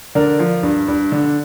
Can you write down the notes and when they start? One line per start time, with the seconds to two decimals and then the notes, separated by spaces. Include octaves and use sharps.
0.15 D3 A#4 D5
0.39 F3
0.63 G2
0.88 G2
1.12 D3